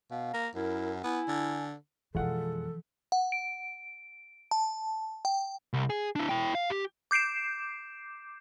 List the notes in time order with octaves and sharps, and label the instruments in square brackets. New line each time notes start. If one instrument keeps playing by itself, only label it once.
[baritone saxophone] B2 [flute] F5
[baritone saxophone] A#3 [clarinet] A#5
[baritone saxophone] F#2 [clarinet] E4 [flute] A#4
[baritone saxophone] B3 [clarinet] E4 [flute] G#5
[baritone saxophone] D3
[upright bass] F2 B2 [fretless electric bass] E3 F3 [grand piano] G#3 F4 F#5 [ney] A4
[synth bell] F#5
D7
A5
G5
[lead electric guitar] C2
G#4
D4 E4
E4 G5
F5
G4
[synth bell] D6 G6 C7 D7 E7